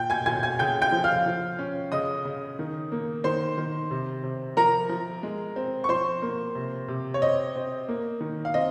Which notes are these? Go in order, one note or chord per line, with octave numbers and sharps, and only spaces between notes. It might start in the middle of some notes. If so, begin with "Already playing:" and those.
Already playing: A#2 G5 G6
G#5 G#6
A#2 G#5 G#6
G#5 G#6
C#3 G5 G6
G5 G6
F3
F5 F6
F3
C#4
C#3 D#5 D#6
C#3
D#3
A#3
D#3 C5 C6
D#3
C3
C3
F3 A#4 A#5
F3
G#3
C4
C#6
F3 C5 C6
A#3
C3
C3
C#5
C4 D#5
C4
A#3
D#3
F5
C4 D#5